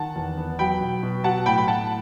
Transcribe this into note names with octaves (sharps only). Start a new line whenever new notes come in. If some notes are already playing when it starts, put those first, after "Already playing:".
Already playing: D#3 F#5 A5
E2
B3
F#3 G5 B5
B2
B2
F#3 F#5 A5
A2 G5 B5
B5
A2 F#5 A5